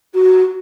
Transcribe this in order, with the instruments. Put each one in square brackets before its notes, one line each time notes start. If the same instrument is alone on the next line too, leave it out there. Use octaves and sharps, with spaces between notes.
[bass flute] F#4